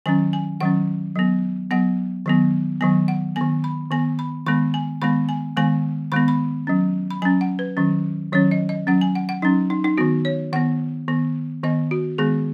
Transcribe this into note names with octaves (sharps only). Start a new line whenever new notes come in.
D#3 F#3 C#4 G#5
G#5
D#3 F#3 C#4 F#5
F#3 B3
F#3 B3 F#5
D#3 F#3 B3
D#3 F#3 B3 G#5
F#5
D#3 B3 G#5
B5
D#3 B3 G#5
B5
D#3 G#3 B3 B5
G#5
D#3 G#3 B3 B5
G#5
D#3 G#3 B3 G#5
D#3 G#3 B3 B5
B5
F#3 C#4
B5
F#3 C#4 G#5
F#5
B4
D#3 F#3 C#4
D#3 F#3 C#4 C#5
D#5
D#5
F#3 C#4 F#5
G#5
F#5
F#5
F#3 C#4 D#4
D#4
D#4
D#3 B3 F#4
C#5
D#3 B3 F#5
D#3 B3
D#3 B3 D#5
F#4
D#3 G#3 B3 G#4